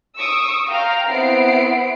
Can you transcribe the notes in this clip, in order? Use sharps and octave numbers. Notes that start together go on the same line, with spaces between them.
C#6 D#6 E6 D7
F5 G5 A#5
B3 C4 E4 F#5 C7 D7